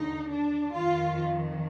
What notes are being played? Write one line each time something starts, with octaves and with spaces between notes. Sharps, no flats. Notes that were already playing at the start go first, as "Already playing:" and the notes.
Already playing: D#2 D3 D#4
D4
F2 D#3 F4